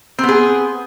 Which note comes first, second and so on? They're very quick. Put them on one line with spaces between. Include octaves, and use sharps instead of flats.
C4 B3 G#4